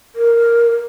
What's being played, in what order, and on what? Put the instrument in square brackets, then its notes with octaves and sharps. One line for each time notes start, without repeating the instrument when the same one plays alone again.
[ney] A#4